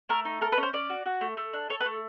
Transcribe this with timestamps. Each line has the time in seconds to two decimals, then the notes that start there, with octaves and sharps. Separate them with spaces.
0.09 A3 A#4
0.25 D#4
0.41 A4 A#4
0.52 B4
0.57 C#4
0.63 C5
0.73 C#4 D5
0.90 F#4
1.06 F#4
1.21 A3
1.37 A3
1.53 D4
1.70 A4 C#5
1.80 B4
1.86 A3